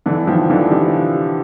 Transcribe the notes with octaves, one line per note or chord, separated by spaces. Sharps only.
D3 E3
D#3 F3
D3 E3
F3 G3